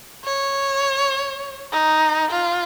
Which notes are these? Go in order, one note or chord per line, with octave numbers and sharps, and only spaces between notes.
C#5
D#4
F4